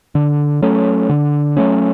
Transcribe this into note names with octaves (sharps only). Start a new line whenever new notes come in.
D3
F#3 A3 C#4
D3
F#3 A3 C#4